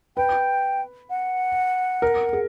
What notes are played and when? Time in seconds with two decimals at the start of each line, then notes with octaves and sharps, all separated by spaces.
0.16 B4 G5
1.10 F#5
2.02 A#4
2.33 G#4